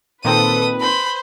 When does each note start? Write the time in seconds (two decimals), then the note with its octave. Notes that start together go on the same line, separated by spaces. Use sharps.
0.25 A#2 D#3 C4 A4 B4 D#6
0.81 C5 B5